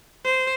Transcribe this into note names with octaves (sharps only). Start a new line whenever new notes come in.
C5